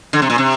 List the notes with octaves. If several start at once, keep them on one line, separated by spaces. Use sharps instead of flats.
D3
C3
A#2
C3